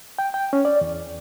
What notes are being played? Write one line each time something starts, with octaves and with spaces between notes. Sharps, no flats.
G5
G5
C#4
D5
E2